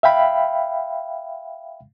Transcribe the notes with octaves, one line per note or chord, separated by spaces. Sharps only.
E5 F5 G5 B5